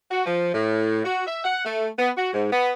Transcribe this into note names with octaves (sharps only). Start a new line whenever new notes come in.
F#4
F3
A2
F#4
E5
F#5
A3
B3
F#4
G#2
B3